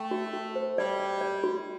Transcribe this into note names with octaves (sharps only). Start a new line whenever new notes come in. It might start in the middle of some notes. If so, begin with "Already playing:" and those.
Already playing: A3 G5
F#4
F#4
C5
G3 D5
D5
D5
F#4